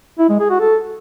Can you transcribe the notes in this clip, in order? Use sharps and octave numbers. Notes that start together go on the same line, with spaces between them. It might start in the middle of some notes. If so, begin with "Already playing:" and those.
E4
G#3
G#4
F#4
A4